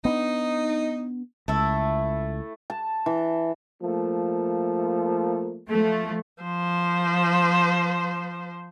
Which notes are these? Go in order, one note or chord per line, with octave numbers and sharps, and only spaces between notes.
B3 C4 D4 D#4
C#2 A3 E4
A5
E3
F3 A3 A#3
F3 A3
F3 C5